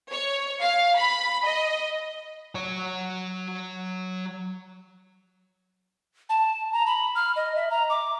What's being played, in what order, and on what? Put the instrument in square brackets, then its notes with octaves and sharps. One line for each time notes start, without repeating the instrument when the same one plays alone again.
[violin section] C#5
F5
B5
D#5
[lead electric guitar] F#3 C#5
[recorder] A5
A#5
B5
F6
D#5
E5
A#5
D6